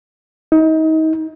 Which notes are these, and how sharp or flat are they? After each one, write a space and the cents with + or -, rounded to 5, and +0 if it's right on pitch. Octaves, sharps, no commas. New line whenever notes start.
D#4 +30